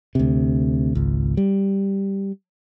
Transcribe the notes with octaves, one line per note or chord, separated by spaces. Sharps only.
D2 C3
G#1 C#2
G3